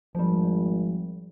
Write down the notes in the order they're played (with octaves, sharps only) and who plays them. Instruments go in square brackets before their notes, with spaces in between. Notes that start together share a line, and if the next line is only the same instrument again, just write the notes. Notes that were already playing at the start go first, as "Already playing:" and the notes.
[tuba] G#1 [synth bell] F3 G3